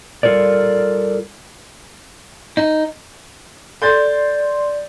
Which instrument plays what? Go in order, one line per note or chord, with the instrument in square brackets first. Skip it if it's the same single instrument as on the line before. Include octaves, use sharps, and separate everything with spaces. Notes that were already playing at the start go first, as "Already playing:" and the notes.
[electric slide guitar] G3 F4 A4 A#4 D5
[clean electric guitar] D#4
[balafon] A4 [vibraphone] D5 [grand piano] C6 G6 A6